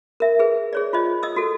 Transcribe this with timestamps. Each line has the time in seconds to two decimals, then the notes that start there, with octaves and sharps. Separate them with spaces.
0.20 A#4 E5
0.39 G#4 B4
0.73 G#4 C#5 D5
0.93 F4 C5 D#5
1.23 D#5 D#6 E6
1.36 F#4 A4